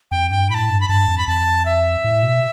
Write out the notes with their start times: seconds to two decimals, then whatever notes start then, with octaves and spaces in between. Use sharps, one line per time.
0.11 F2 G5
0.31 G2 G5
0.50 A2 A5 B5
0.69 G2
0.81 B5
0.88 G2 A5
1.08 F2
1.18 B5
1.27 F2 A5
1.66 E5
2.04 A2
2.23 B2